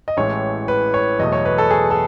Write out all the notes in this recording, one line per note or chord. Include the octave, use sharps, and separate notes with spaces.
D#5
A1 A2 E3 G#3 C#5
B4
C#5
E2 B2 F#3 A3 D#5
C#5
B4
A4
G#4
A4